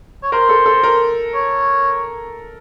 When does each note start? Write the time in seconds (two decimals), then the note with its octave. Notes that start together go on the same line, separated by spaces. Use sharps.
0.23 C#5
0.32 A#4 C5
0.49 A4
0.66 A4
0.83 A#4
1.34 C#5